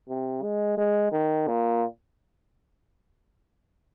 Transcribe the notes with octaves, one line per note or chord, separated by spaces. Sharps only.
C3
G#3
G#3
D#3
A#2